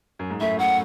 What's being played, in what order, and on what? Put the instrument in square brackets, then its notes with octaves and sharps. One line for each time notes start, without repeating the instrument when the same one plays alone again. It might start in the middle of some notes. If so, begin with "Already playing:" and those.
[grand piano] F#2
G#2
[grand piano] F#2 A2 [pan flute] E5
[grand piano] F#2 A2 [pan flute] F#5